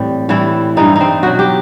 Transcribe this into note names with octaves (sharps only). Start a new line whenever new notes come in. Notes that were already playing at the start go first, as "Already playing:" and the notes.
Already playing: A2 E3 G3 C4
A2 E3 G3 E4
G2 E3 G3 D#4
D#4
C4
B2 F#3 F#4
G4